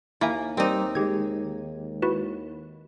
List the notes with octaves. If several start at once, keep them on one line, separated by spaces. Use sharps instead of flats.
D#2 A#3 E4 E5 G#5
G3 C4 D#4 A#4 D5
D#3 G#3 G4 G#6
E4 F#4 B4